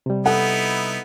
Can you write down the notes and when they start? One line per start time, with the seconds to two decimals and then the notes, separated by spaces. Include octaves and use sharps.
0.06 C3 G3
0.26 B3 D#4 E4 A4 F#5